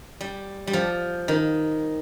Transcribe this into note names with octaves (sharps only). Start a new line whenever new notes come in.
G3
G3
F3
D#3